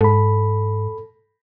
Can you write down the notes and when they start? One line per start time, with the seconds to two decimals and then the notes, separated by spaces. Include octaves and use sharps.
0.01 G#2 A4 B5